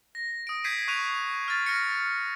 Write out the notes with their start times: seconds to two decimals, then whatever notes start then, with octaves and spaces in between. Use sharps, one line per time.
0.15 A#6
0.47 D#6 D7
0.64 G6 G#6 B6 C7 D7 D#7
0.88 C#6 F#6 D#7 F7
1.48 F6 A6
1.66 F6 A#6 C#7